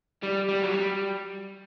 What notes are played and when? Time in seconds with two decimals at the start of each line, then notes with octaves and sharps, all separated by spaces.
0.23 G3
0.49 G3
0.63 F#3
0.74 G3